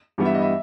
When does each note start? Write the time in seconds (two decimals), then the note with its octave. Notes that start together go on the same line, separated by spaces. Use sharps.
0.18 G2 E3 G3 B3
0.25 E5
0.34 D#5
0.42 E5